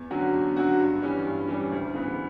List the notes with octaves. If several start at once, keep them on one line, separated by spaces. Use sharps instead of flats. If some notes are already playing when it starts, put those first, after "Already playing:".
Already playing: E2
D3 F#3 C#4 F#4
E2
D3 F#3 C#4 F#4
G2
E3 G3 C#4
G2
E3 G3 C#4
D2
C#3 E3 B3